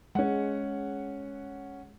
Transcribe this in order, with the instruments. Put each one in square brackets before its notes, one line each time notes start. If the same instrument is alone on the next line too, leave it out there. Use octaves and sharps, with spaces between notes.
[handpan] G#3 [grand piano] C#4 F#5